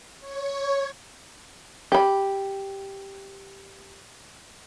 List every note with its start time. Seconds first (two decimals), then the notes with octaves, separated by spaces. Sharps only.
0.20 C#5
1.92 G4 B5